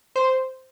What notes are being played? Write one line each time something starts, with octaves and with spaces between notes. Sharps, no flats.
C5